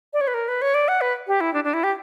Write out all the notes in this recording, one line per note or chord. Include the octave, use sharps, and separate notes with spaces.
D5
C#5
B4
A#4
B4
C#5
D5
F#5
B4
G4
E4
D4
D4
E4
G4